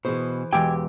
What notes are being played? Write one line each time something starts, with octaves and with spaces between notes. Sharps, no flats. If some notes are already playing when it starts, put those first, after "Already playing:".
B2 E3 G#4 C5
E1 G4 G5 G#5 D6 E6